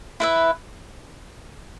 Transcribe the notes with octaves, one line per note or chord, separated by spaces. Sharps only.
E4 B4 E5